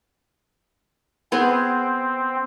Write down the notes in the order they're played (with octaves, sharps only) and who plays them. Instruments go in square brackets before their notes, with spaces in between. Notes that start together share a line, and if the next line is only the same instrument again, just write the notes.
[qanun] B3 G#4 [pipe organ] C4